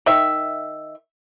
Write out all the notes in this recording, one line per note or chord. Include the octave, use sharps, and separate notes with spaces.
D#3 E5